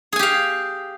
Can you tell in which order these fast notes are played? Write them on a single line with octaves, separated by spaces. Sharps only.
G#4 G#5 G4 F5